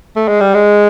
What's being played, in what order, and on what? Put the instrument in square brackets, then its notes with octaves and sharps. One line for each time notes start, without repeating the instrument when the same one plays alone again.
[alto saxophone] A3
G#3
G3
G#3